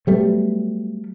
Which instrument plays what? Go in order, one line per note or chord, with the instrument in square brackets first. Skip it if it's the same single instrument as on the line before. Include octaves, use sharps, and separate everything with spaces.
[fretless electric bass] F#3 G3 A3 B3